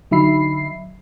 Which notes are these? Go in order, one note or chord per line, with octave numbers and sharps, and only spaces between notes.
D3 F#3 D#4 E5 B5 C7